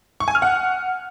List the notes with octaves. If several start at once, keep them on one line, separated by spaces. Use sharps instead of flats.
C#6
G#5
F6
F#5